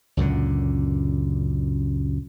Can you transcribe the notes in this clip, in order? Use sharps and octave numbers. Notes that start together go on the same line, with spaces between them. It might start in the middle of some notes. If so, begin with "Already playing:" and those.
C#2 F#2 A#2 D3